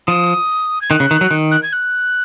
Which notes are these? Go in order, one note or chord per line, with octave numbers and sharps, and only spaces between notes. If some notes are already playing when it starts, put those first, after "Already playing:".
F3 D#6
G#6
D#3 F#6
C#3
D#3
F#3
D#3
F#6
G#6
F#6